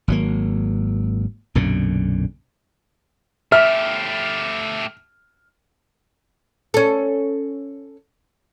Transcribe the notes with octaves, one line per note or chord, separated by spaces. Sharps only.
G#1 F#3 A#3
B1 F#2 A#2 D3
A3 G4 E5 F6
C#4 A4